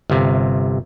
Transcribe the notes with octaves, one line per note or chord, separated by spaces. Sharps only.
G1 C3